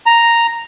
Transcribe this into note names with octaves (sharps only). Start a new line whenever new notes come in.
A#5